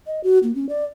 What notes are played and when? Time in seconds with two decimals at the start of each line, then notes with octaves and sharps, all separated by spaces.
0.07 D#5
0.24 F#4
0.43 A#3
0.55 C#4
0.69 D5